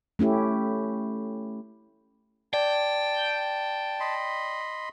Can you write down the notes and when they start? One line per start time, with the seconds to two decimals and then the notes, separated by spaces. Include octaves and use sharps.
0.19 A3 C#4 E4 G4
2.53 D5 G5 A5
4.00 D#5 B5 C6